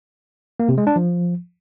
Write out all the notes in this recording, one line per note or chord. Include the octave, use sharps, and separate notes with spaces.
A#3
C3
G#3
D4
F3